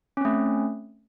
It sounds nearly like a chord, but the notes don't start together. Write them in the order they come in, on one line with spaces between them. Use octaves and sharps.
C#4 C4 A3